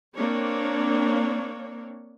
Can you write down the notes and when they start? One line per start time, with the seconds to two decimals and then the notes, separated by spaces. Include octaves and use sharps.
0.15 A#3 C4 D4 C#5